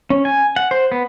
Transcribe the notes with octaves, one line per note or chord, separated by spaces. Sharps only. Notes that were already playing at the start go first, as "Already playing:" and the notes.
C#4
G#5
F#5
C5
B3